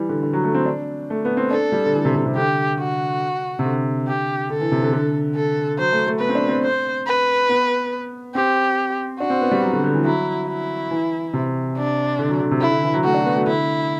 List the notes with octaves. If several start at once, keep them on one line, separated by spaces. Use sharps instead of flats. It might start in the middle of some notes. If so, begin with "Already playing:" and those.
Already playing: E3 G3
D3
D3
F#3
A3
C4
D4
A3
B3
C4
D4 A4
G3
D3
E3
C3
C3
C3
D3 G4
F#4
C3
D3
G4
D3 A4
E3
C3
D3
D3
A4
F#3 C5
A3
A3
B3 B4
C4
D4
C4
C5
B4
B3
C4 G4
D4 F#4
C4
B3
G3
F#3
D3
D3
E3
F#3 E4
E4
E3
C3
D4
D3
F#3
D3
C3
D3 E4
D3
E3
F#3
A3 F#4
D4
B3
A3
D3 E4